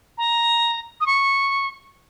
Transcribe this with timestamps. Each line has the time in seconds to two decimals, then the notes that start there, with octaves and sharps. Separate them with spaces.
0.18 A#5
1.01 D#6
1.06 C#6